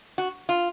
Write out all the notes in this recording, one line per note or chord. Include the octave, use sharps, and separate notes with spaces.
F#4
F4